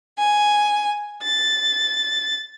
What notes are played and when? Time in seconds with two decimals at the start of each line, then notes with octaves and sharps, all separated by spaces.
0.18 G#5
1.21 A6